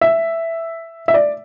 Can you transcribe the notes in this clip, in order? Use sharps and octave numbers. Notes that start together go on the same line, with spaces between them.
E5
E5
D5